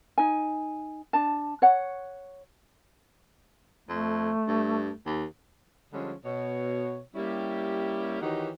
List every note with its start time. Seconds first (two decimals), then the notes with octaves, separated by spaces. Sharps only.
0.18 D#4 G#5
1.13 D4 A5
1.62 C#5 F#5
3.89 F2 A3
4.48 G2
5.06 D#2
5.93 D3 F3 G3 G#3 C#4 G#4
6.25 B2 C#5
7.15 G3 A#3 C#4 E4 G4
8.22 D#3 E3 D#4 F#4 G4 C#5